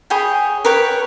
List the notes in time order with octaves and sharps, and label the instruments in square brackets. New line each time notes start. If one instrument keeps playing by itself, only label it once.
[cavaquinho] G#4 C#5 G5 B5
A#4 B4 C#5 G5